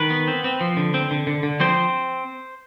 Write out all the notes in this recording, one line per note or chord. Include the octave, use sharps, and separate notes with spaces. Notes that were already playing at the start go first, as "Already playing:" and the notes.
Already playing: D#3 B4
B3
C4
C4
F3
D3
C4
D3
D3
D3
F3 C4 C5